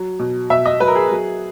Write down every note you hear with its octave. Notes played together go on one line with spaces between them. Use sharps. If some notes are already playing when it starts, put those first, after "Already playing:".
Already playing: F#3
B2
B2 E5
D#5
F#3 B4
A#4
G#4
F#3